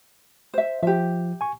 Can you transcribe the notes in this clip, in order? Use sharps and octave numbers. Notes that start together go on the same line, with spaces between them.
C5 E5
F3 G4 E5
G#5 C#6